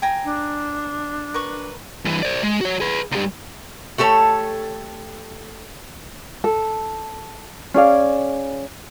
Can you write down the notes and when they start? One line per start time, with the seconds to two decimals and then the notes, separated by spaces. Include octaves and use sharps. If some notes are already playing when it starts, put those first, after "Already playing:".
0.02 G5 G#5 A#5
0.24 D4
1.34 A#4 B4 C#6
2.05 G2 E3
2.23 C5 D5
2.43 G#3
2.61 F#4 C#5
2.80 G#4 B4
3.12 C2 G2
3.98 A3 G4 A4 C5 C#5
6.44 A4
7.74 C#4 G#4 D5 F5